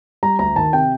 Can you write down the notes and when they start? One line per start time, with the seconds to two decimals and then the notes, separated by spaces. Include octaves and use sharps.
0.23 G3 A#5
0.39 D2 A#5
0.56 D#3 A5
0.73 C3 G5